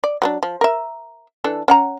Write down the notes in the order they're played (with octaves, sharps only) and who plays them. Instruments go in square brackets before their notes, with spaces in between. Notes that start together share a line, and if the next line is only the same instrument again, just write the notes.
[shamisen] D5
F#3 B3 D4
F3
A#4 E5
E3 D4 A4
C#4 F#5 A#5